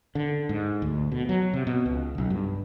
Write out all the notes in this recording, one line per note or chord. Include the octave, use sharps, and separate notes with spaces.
D3
G#2
D2
B2
F#3
C3
B2
C#2
B1
G2